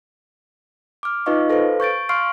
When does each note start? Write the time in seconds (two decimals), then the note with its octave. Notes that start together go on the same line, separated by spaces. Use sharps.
1.03 D6 F6
1.26 D#4 F4 B4 D#5 F5 C#6
1.50 A4 B4 C5 F5
1.80 C#6 G6 A6 D7
2.09 F5 C6 C#6 F6 C7 D7